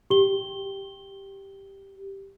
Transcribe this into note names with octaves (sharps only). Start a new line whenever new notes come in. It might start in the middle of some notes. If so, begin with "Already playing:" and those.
G4 G7